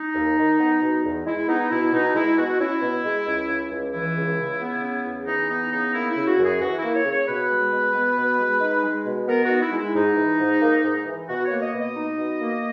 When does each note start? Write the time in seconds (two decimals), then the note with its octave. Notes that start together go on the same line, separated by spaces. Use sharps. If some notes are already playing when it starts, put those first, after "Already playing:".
Already playing: D#4
0.14 D#2
0.37 D#3
0.59 B3
0.82 B2
1.04 E2
1.26 G#3 E4
1.48 B3 D#4
1.70 B2 E4
1.93 B2 D#4
2.15 G#3 E4
2.37 B2 F#4
2.59 C#4 E4
2.81 B2
3.04 G#3
3.26 C#2
3.49 C#3
3.71 C#2
3.93 E3 E4
4.16 C#2
4.38 C#3
4.60 B3
4.82 C#3
5.04 E2
5.26 E3 D#4
5.49 B3 D#4
5.71 C#3 D#4
5.93 A#3 E4
6.11 C#3 E4
6.27 F#4
6.38 F#2
6.44 G#4
6.60 E3 F#4
6.77 E4
6.82 A#3
6.94 C#5
7.05 C#3
7.10 C#5
7.27 B2 B4
7.50 G#3
7.72 B2
7.94 B3
8.16 B2
8.39 G#3
8.60 D#4
8.83 G#3
9.05 B2
9.27 B3 A#4
9.44 F#4
9.50 D#4
9.62 E4
9.72 G#3
9.77 E4
9.94 G#2 D#4
10.17 E3
10.39 G#2
10.62 A#3
10.83 G#2
11.06 E3
11.28 B2 F#4
11.45 C#5
11.50 A#3
11.62 D#5
11.72 B2
11.79 D#5
11.95 D#4
12.17 B2
12.40 A#3